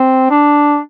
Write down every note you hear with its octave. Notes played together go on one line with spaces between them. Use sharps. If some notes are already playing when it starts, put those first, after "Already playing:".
Already playing: C4
D4